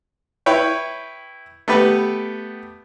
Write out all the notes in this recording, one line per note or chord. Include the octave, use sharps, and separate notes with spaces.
E4 B4 C#5 G5
A3 B3 G4 B4